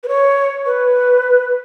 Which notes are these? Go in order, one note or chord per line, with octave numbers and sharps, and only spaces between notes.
B4
C#5
B4